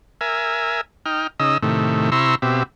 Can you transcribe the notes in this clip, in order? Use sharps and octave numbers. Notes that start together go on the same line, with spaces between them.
A#4 E5 G#5
D#4 G5 F6
C#3 D#4 D#5 E6
A2 C3 D#3 A3
C3 E4 A#5 C6 C#6 E6
B2 C4 G4 E5